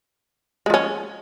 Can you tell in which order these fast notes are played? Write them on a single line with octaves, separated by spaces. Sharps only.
G#3 F3 C#4